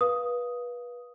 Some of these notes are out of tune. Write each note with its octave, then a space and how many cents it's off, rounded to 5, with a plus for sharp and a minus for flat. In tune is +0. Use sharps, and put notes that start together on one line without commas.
B4 -25 F5 +0 D#6 +5